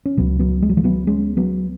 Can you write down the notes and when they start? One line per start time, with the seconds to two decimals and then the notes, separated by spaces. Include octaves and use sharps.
0.05 C#4
0.17 C#2 B2 F#3 B3
0.39 F#3 B3
0.62 G#3
0.69 F#3
0.77 E3 G#3
0.84 F#3 B3
1.07 G#3 C#4
1.37 F#3 B3